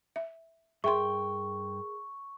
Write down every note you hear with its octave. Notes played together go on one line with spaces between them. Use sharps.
E5
G2 G#4 A#4 E5 G5 C6 C#6